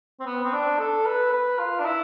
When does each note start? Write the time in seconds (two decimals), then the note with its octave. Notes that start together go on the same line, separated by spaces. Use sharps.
0.20 C4
0.26 B3
0.44 C4
0.52 D4
0.79 A4
1.05 B4
1.32 B4
1.59 F4
1.79 D4
1.85 E4